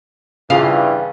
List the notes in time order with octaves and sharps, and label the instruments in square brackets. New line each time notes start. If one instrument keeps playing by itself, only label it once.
[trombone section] G2 E3 [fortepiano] C#3 F4 [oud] F5